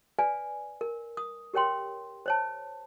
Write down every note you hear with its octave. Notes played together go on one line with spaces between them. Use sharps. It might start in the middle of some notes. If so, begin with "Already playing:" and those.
B4 D5 F5 G#5
A#4
D#6
G4 A#4 C#5 G5 C6
C5 C#5 A5